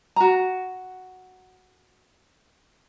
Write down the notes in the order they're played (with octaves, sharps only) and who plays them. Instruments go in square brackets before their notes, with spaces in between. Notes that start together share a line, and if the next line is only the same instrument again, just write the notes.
[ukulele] F#4 A#5